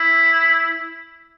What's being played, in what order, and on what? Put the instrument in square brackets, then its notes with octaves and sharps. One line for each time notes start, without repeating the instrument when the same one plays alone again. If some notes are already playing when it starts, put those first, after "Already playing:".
Already playing: [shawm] E4